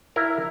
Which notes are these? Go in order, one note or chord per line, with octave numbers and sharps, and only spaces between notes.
E4 A#4